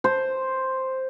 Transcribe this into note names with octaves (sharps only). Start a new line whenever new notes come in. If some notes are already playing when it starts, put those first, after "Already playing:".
C5